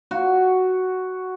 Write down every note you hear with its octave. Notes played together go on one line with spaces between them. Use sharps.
F#4